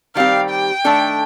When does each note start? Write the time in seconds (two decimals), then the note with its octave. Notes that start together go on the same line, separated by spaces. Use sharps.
0.15 D#3 G3 C4 G4 F5
0.50 G5
0.85 D#3 A3 D4 A4